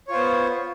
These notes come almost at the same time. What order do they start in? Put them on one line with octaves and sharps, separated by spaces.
C#5 F4 C5 B3